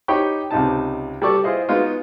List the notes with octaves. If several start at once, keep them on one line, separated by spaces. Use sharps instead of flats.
D#4 G4 C#5 G5 B5 C#6
C#2 C3 D#4 A5
G3 A4 D5 C#6
E4 F4 G#4 C5 D#5
G#3 B3 D#4 F4 F#4